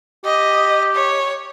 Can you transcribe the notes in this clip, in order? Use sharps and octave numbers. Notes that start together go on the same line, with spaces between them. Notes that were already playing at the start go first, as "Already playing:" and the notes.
G4 D#5
C#5